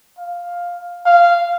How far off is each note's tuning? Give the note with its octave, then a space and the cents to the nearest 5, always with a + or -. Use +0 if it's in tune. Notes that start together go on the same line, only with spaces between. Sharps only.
F5 +5
F5 -10